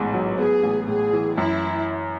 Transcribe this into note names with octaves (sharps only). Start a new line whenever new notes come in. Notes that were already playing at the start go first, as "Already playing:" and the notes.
Already playing: A1 G#2 B3
F#3
B3 G#4
A1
A2 G#4
E3
F#2 E4